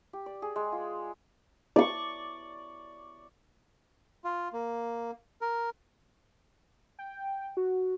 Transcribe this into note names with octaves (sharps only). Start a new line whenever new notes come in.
G4
D5
G#4
G#3
F4
D5 C#6
F4
A#3
A#4
G5
F#4